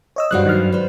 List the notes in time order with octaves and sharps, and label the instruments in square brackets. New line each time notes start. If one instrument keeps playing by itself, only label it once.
[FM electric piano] C#5 D#5 E6
[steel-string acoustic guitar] G2 G3 C5 [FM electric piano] F#4 F#6
[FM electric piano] D#3 F#3 F6
[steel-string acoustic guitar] B4 C5